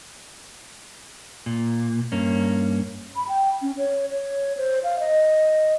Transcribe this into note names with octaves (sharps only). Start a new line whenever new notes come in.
A#2
G2 A#3 C#4
B5
G5
C#4
C#5
C#5
C5
F5
D#5